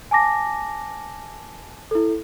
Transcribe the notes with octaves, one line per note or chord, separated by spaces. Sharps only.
G#5 A5 D6 A#6
E4 A4